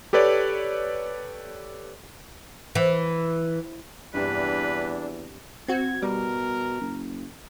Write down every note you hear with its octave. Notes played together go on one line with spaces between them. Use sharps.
G4 A4 B4 C#5 D5
E3
E2 G2 C3 G3 D4 B4
C4 F#4 G#6
B2 G3 A#4
F#1